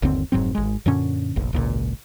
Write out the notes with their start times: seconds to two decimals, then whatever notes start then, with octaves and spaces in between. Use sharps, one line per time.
0.02 G1 D#2 D3 C4
0.32 F1 G#2 F#3 C4
0.55 G#1 G#3
0.86 F#2 A#2 D3 C#4
1.36 F1 A#1
1.53 G#1 C#2 A#2